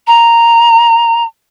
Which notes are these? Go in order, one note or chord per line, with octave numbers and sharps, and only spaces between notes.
A#5